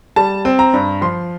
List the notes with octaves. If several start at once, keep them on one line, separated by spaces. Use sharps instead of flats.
G3 A5
C4
A#5
G2
F3 C6